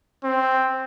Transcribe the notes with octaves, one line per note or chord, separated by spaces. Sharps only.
C4